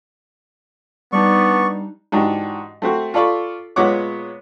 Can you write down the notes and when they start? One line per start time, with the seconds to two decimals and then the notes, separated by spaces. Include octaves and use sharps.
1.12 G3 B3 D4 D#4 D5 C#6
2.12 G#2 E3 D4 F#4 G4
2.82 A3 C4 F#4
3.14 F4 A4 D5 B5 C#6
3.76 A#2 G#3 B3 C#5 F#5 D6